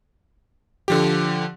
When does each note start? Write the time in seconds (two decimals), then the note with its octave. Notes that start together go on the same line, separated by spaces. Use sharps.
0.88 D3 F3 G4